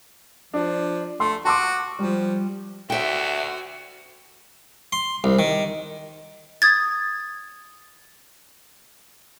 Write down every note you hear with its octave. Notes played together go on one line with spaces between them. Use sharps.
F3 D4
A3 C6
F#4 A5 C6 D6
F3 G3
D2 F#4 E5 G5
C6
C2
D#3
D#6 G#6 A6